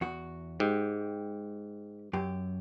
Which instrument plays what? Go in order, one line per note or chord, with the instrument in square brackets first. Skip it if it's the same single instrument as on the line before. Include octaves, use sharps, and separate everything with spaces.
[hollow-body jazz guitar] E2 F#4
[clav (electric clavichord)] G#2 [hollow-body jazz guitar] G4
[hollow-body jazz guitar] F#2 G4